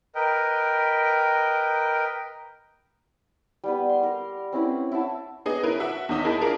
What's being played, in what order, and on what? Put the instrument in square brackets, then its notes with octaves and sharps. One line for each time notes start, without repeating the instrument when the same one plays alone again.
[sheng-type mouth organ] A#4 B4 D#5 G5
[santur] G3 B3 B4
C6
A#4
C4 C#4 E4 B4
E4 E5 F#5 A5
[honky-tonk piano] B3 G#4 D#5
C#4 E4 A#4 B4
F#4 E5 F#5
E2 D#3 D#4 D#5 B6
D#4 E4 G#4 A#4 A5 B5
D4 F4 G#4 A#4